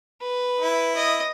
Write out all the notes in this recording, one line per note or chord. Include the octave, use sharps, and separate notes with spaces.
B4
E4
D#5